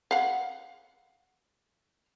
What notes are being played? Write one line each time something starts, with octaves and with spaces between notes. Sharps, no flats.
F5 F#5